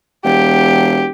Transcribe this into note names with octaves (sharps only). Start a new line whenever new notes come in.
E1 G4